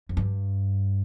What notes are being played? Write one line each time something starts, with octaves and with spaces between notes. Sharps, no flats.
F2
G2